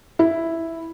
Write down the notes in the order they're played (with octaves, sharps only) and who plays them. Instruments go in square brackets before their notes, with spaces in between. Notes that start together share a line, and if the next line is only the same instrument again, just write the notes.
[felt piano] E4